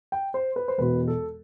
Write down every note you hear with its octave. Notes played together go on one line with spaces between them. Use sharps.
G5
C5
B4
C5
E1 E2 B2 B4
A4